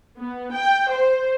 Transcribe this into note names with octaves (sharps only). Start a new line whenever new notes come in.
B3
G5
C5